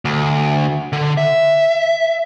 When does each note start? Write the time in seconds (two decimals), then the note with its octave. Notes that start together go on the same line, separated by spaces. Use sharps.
0.05 D2
0.93 D3
1.18 E5